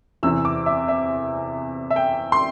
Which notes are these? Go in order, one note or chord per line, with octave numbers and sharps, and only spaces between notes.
E2 C3 E3 E6
D6
E5
E5
E5
G5
C6